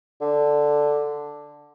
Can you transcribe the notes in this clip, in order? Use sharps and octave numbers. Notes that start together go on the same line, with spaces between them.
D3